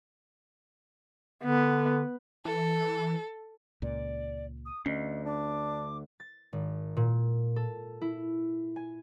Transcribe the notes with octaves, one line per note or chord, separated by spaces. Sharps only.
D3 B3
E3 A4
C#2 A#2 D5
D#6
D2 C#4 D#5
D4 D6
A6
G#1
A#2
A4
E4
G#5